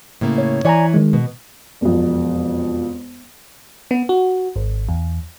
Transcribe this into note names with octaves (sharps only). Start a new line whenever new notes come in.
A2 C#3 A#3
C#5
E3 C#5 D5 G#5 A#5
D#3 G#3
B2
E1 F2
B3
F#4
G#1
E2